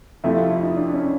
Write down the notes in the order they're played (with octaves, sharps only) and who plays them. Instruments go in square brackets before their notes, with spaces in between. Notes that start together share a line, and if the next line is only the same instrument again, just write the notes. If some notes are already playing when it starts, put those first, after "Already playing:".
[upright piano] F2 C3 F3 A3 [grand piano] E4
[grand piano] F4
E4
D#4
D4
D4
C#4